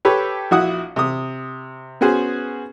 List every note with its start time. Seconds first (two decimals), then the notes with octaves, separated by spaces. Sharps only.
0.05 G4 A4 B4 C#5
0.51 A#1 E4 F#4 F#5 D#6
0.96 C3 D#6
2.01 B3 C#4 F#4 G#4 C5